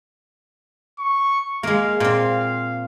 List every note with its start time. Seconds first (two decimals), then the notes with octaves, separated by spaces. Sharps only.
0.99 C#6
1.63 G#3 A#3 F5
2.00 A#2 C4 F5